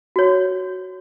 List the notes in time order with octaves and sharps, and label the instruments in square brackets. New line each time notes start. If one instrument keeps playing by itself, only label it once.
[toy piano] F#4 C#5